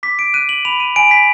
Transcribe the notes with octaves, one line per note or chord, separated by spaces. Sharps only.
D6 B6
D7
F#6 D#7
F#7
B5 F7
D#7
G#5 D7
B6